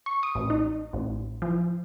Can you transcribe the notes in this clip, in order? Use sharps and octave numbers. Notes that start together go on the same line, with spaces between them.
C#6
D#6
A1
D#4
A1
F3